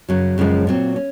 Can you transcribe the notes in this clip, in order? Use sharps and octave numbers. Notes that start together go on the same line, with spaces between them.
F#2 C#3 F#3
F#2 C#3 F3 G#3
A#2 F#3 C4
C#4